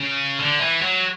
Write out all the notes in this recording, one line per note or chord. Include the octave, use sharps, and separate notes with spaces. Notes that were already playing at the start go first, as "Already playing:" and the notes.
Already playing: C#3
D3
E3
F#3